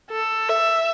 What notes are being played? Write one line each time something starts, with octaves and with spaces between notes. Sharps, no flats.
A4
E5